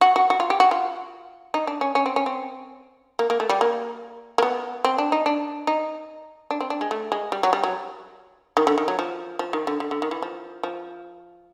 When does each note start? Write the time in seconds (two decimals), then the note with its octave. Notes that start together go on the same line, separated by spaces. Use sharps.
0.01 F#4
0.16 F#4
0.30 F#4
0.40 F4
0.50 G4
0.60 F#4
0.71 F4
1.54 D#4
1.67 D4
1.81 C#4
1.95 C#4
2.06 C4
2.16 C#4
2.26 C4
3.19 A#3
3.30 A#3
3.40 A3
3.49 G3
3.61 A#3
4.38 A#3
4.43 B3
4.84 C4
4.98 D4
5.12 D#4
5.26 D4
5.67 D#4
6.51 D4
6.60 C4
6.70 D4
6.81 G#3
6.91 A3
7.12 G#3
7.32 G3
7.43 F#3
7.53 G3
7.63 F#3
8.57 D#3
8.67 D3
8.78 D#3
8.88 F#3
8.99 F3
9.39 F3
9.53 D#3
9.67 D3
9.80 D3
9.91 D3
10.02 D#3
10.11 E3
10.22 F3
10.63 F3